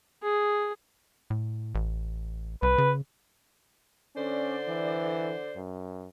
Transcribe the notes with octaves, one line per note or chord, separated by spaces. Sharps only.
G#4
A2
A1
C2 B4
C#3
D3 C#4 C5 D5
E3
F#2